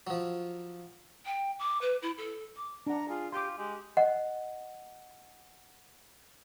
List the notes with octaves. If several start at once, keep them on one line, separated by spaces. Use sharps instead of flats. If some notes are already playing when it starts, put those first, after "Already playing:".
F3 F#3
G5
D6
B4
E4
A4
D6
D4 F#5 A#5
F4 G#4
F4 G4 C6 D6
G#3 G4
D#5 F#5